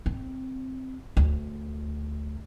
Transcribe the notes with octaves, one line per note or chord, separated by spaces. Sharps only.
C4
D2